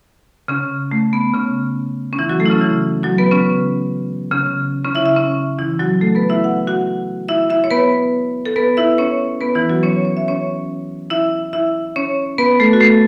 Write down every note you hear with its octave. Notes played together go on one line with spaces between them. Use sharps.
C#3 C#4
A3
B3
C#3 C#4
C#4
E3 E4
F#3 F#4
A3 A4
E4
C#3 C#4
E3 E4
F#3 F#4
B3 B4
C#3 C#4
C#3 C#4
C#3 C#4
E4 E5
E4 E5
C#3 C#4
E3 E4
F#3 F#4
A3 A4
B3 B4
E4 E5
F#5
F#4 F#5
E4 E5
E4 E5
C#5
B3 B4
A4
B3 B4
E4 E5
C#4 C#5
B3 B4
E3 E4
F#3 F#4
C#4 C#5
C#5
E5
C#4 C#5
E4 E5
E4 E5
C#4 C#5
B3 B4
A3 A4
F#4
A3 A4